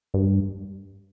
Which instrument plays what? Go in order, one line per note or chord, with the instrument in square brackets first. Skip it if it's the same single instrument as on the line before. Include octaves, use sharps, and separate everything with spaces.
[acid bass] G2